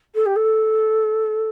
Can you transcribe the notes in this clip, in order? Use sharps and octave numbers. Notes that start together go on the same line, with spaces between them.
A4
G4
A4